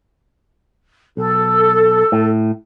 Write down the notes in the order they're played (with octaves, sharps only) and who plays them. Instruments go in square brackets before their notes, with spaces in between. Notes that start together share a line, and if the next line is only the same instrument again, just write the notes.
[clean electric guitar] B1 [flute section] A4
[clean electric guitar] A2